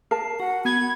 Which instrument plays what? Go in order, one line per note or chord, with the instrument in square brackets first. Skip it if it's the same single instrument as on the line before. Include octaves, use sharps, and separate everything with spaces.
[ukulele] A#4 A5 [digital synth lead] C7
[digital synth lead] F#4 [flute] F#5
[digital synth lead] B3 [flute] B5 [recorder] G#6